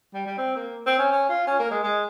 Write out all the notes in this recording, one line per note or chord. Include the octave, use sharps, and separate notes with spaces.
G3
G3
C4
A#3
C4
C#4
C#4
F4
C#4
A#3
G#3
G#3